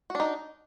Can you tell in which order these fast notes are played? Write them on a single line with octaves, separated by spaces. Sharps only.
F#4 D4 D#4